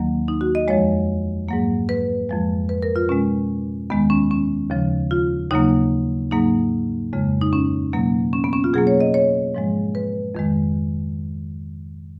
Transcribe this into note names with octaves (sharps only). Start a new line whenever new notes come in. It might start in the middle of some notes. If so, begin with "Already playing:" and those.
Already playing: D#2 D#3 F#3 A#3
D#4
F#4
D#5
F2 F3 G#3 C#5
G#2 F#3 A#3
B4
F2 F3 G#3
B4
A#4
F4
B2 G#3 C#4
D#2 D#3 G#3 B3
C#4
C#4
D#2 C#3 F3
F4
D#2 C#3 F#3 A#3 D#4
G#2 F#3 A#3 D#4
F2 C#3 G#3
D#4
C#4
B2 F#3 A#3
C#4
B3
C#4
F4
B2 F#3 A#3 G#4
C#5
D#5
C#5
G#2 F3 G#3
B4
F2 D#3 G#3